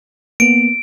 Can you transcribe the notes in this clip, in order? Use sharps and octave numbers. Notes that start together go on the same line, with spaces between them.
A#3 B3 D7